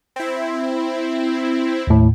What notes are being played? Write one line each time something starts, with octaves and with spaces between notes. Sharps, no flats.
C4 E4
D#2 A2